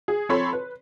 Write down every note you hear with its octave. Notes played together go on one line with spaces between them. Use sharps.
G#4
F3 C4 A4 C#5 B5 C6
B4